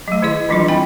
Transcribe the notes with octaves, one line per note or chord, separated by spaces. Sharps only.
F#3 A3
D#3 E4 G#4 D#5
E3 F#3 G3 D4 E4 F4
C4 D#5 G5 G#5 B5